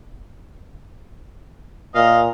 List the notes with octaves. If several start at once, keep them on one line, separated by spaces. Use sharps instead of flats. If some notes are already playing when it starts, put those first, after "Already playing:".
A#2 D#5 F5